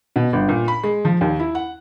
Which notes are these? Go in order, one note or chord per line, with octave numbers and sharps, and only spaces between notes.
B2
G1
A#2
B5
G#3
F3
D#2
E4
F#5